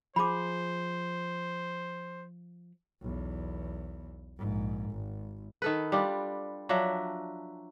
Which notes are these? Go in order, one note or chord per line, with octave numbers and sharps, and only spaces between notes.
F3 G#4 C5 B5 D6
B1 E2
A#1 G#2
G#1
D#3 A4 B4
G3 D4 F4 G4
F3 F#3 D4 E5